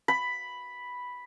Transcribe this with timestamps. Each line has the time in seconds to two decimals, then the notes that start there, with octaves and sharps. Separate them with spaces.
0.08 B5